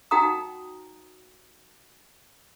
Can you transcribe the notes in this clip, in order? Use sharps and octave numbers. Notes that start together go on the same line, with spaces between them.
D#4 F#4 F#5 G5 A#5 D#6